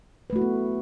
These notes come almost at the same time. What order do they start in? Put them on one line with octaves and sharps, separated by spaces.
B4 A3 F#4 E4 B3